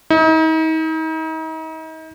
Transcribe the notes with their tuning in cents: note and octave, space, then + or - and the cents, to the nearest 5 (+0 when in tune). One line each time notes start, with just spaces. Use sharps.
D#4 +40